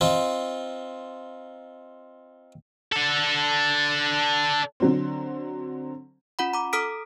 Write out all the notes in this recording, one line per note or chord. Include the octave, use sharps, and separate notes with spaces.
C4 D#4 F4
D4 A4
D3 F#3 C4
C#4 F4 F#5 B5
A#5 D6
A4 A#5 D#6 F6 B6 D7